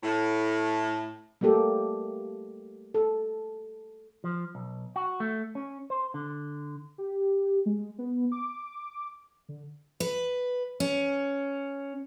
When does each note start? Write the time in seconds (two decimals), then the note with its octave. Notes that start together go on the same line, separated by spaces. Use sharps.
0.02 A2
1.41 G3 A3 A#3 G4 A4
2.94 A4
4.24 F3
4.55 B1
4.96 F#4
5.20 A3
5.55 C#4
5.90 C5
6.14 D3
6.98 G4
7.66 G#3
7.98 B3
8.32 D6
9.49 D3
10.00 B4
10.80 C#4